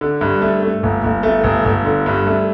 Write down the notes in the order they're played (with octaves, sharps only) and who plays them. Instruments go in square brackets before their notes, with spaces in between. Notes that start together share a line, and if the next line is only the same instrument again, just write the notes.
[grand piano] D3
G2
A3
A3
G1
G1
A3
G1
G1
D3
G2
A3